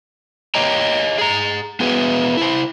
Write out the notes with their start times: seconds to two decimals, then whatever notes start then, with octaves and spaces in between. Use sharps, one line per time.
0.55 G4 C#5 D#5 G5 A#5
1.18 G#4 A#5
1.80 B3 F#4 G#4 B4
2.37 E4 C5